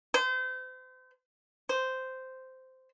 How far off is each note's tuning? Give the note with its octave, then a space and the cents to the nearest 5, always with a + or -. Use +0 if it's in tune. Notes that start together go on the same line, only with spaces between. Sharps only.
C5 -35
C5 -10